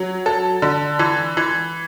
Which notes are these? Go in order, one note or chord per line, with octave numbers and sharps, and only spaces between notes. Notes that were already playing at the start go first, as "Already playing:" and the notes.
Already playing: F#3
A4
D3
E3
E3